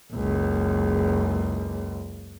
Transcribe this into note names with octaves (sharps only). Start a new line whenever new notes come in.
F#1 C#2